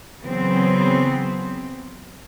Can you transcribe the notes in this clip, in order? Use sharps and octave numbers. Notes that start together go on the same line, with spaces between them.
C#3 E3 F#3 B3 C4